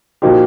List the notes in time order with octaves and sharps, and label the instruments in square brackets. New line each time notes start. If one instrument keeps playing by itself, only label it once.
[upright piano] A#2 F3 A#3 D#4 G4 [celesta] F#4